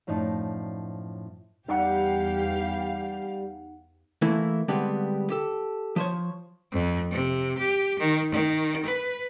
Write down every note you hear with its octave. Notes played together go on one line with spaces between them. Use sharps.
F#2 A2 F3 D4 D#4
E2 G3 D#4 G4 F5 F#5
E3 A3 A#3 E4
D3 G3 G#3 B3 C4 G4
G4 A4
F3 C5 C#5
F2
C3
G4
D#3
D#3
B4